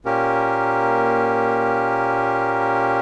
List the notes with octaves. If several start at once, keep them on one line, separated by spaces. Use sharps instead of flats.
A#2 A#3 C#4 G4 A#4